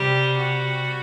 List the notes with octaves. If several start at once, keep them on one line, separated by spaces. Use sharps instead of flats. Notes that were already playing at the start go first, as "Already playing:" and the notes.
Already playing: C3 G3 G4
F#4